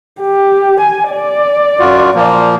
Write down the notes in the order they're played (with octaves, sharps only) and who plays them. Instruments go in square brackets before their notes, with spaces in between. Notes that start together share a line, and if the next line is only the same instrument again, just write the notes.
[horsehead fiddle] G4
G#5
D5
[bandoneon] F#2 F4 F#4
A#2 F3 A#3